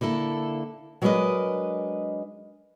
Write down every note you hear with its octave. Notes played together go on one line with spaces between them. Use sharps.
D3 A#3 E4 A4
F#3 G#3 D4 A#4 B4 D#5